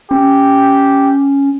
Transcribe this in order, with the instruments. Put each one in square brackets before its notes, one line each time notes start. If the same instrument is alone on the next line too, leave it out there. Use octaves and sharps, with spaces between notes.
[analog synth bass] C#4 [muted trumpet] G4